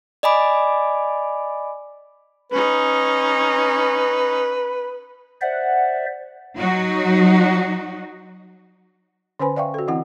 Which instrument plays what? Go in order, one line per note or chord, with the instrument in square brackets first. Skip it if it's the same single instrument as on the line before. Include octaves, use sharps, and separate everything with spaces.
[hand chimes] D5 D#5 G#5 B5 D6
[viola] C#4 D#4 [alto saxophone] B4
[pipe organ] C5 D5 E5 [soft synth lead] F#5
[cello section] F#3 D#4 F#4
[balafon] D3 C#4 B4 C5 G#5 B5
D5 E5 F5 G5 C#6
F#4 A4
E3 C4 E4 F#5